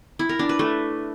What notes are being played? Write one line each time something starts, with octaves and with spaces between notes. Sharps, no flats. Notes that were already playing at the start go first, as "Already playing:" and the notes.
E4
A#4
D4
B4
A3